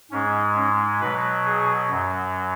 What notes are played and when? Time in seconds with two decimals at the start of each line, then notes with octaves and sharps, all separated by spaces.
0.11 G#2 G#3 C#4
0.56 C#4
1.00 B2 F#3 B4
1.45 G#4
1.90 F#2 F#3